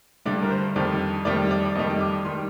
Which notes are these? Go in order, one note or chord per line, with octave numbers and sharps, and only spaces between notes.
G2 D3 G3 D5
A#4
C5
F2 D#3 G3 D5
F2 D#3 G3 D5
D5
D5
F2 D#3 G3 D#5
D6
D#3 G3 C6